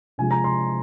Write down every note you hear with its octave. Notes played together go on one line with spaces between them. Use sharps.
C3 F3 G#3 G#5
A#5
C6